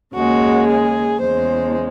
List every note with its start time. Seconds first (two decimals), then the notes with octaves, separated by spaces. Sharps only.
0.14 D#2 C#3 G#3 F#4
0.67 G#4
1.21 E2 C#3 G#3 C5